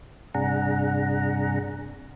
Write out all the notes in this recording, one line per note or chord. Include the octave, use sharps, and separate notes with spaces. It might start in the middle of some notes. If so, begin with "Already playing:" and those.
G2 C3 D4 G#4 F#5 A#5